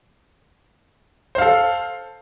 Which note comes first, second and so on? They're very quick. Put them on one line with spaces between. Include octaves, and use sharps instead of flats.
C5 F5 A4